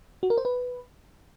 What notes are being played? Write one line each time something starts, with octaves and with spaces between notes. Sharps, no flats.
F#4
A#4
C5
B4